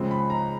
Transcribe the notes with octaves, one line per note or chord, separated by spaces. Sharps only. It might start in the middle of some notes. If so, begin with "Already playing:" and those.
Already playing: C#2 C#3 F3 G#3 C4
B5
A#5